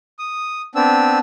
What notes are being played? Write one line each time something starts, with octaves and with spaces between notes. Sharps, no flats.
D#6
B3 C4 D4 E6